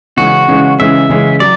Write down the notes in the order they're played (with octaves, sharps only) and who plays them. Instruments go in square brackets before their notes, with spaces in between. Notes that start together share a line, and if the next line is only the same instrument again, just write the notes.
[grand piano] C#3 E3 G#3 C#4 [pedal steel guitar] F#4
[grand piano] C#3 E3 G#3 C#4
[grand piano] C#3 E3 G#3 C#4 [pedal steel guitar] E5
[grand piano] C#3 E3 G#3 C#4
[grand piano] F#3 [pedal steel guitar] D5